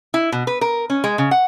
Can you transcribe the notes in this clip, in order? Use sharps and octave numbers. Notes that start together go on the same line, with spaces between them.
E4
B2
B4
A#4
C#4
G#3
C#3
F#5